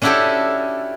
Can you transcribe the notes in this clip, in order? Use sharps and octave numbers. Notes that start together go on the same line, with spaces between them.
C#4 D4 E4 F#4 G4 A4